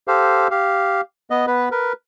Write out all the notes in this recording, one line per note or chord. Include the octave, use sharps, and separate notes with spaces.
G4 A4 C5 F5
G4 F5
B3 D#5
B3 B4
A#4 B4